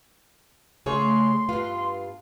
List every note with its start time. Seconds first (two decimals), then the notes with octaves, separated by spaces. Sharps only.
0.86 C#3 A3 G#4 C#5 C6
1.49 G2 B3 F4